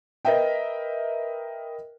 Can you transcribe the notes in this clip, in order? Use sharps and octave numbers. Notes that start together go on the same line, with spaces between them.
A#4 B4 D#5 E5 G5